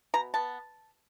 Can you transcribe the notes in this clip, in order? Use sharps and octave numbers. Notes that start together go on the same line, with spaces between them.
B2 A#5
B3 A5